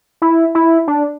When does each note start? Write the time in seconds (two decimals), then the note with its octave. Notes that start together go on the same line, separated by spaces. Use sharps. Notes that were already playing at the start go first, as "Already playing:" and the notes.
0.22 E4
0.55 E4
0.88 D4